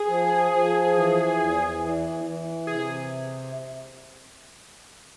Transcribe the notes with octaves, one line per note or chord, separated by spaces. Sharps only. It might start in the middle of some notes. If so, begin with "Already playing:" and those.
Already playing: G#4
F3
F3
E3
E2
E3
E3
C3 G#4